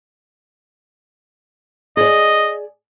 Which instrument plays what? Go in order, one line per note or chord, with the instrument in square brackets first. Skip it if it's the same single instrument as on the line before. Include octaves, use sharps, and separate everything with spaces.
[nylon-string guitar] G#4 D5 [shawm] D#5